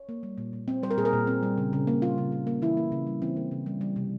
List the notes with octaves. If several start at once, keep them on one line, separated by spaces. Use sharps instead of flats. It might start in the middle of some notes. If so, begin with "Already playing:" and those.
Already playing: C#5
A#3
G3
A#2
A#2
C4
G3 C5
A#4
A#2 G#4
A#4
A#2
C4
G3
C#3
C#3
A#3
G3 F4
C#3
C#3
A#3
E3 E4
A#3
C#3
G3
E3 C4
A#3
C#3
G3
G3
C3